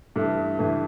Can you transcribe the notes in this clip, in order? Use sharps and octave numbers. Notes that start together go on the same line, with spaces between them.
G2 E3 A3
G2 E3 A3